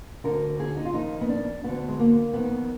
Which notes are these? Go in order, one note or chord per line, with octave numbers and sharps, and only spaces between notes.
D2 D3 A#4
G#4
D#4
F4
F2 D#3 D#4
B3
D4
D2 D3 B3
G#3
A#3
F2 D#3 B3